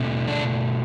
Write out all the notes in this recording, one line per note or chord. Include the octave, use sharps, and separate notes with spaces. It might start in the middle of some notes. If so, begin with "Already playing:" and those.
Already playing: B2 A3 C4
D4